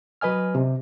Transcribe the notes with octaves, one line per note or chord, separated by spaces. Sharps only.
F#3 B4 D#5 G#5 F6
C3